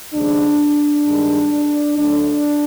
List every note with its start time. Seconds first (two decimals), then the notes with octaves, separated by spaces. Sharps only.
0.13 D#2 C#3 F3 G#3 D4
1.06 G2 D#3 G#3
1.97 D2 D3 F#3 A3 D4